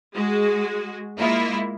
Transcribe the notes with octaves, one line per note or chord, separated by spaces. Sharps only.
G#3 F#4
G#3 A#3 E4 F4